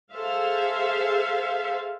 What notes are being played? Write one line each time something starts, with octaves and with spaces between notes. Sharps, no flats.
G#4 A4 C5 E5 F5